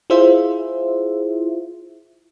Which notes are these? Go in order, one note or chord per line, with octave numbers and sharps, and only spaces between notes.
E4 F4 G#4 C5 E5